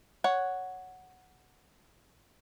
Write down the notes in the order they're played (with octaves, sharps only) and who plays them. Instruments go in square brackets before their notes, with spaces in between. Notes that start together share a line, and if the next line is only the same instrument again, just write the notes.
[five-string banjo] C#5 F#5